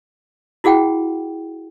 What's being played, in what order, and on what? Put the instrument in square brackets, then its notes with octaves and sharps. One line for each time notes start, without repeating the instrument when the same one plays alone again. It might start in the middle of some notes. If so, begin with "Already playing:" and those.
[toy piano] E4 F#4 G#4 F#5 G5